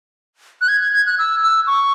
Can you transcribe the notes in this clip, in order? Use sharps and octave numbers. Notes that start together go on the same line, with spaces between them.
F#6
G#6
G#6
G#6
F#6
E6
E6
C#6